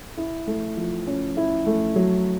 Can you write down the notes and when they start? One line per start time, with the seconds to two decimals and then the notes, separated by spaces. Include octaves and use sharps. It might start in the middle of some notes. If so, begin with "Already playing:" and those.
0.17 E4
0.47 A3
0.77 F3
1.07 C#4
1.37 E4
1.67 A3
1.96 F#3